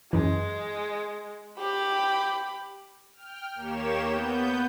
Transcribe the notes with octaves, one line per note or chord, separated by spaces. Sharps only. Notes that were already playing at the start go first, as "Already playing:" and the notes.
F#2 E3 G#3
G4 B5
G5 F6
D#2 A#3 G4 C#5 E7
B3 G6